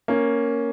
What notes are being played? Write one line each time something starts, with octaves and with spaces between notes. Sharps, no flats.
A#3 C#4